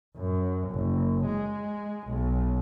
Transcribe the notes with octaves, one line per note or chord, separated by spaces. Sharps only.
F#2
F#1
G#3
B1